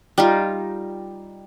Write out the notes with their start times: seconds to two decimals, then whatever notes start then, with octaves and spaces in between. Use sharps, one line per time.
0.18 G3 D#4 F4